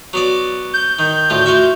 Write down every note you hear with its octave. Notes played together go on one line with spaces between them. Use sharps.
F#3 B3 D5
G6
D#3
D2 A2 F4
F4 F#4 E5